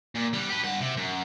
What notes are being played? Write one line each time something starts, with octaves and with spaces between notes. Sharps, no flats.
A#2
G3 B3
G4 B4
G2 F#5
C3
F#2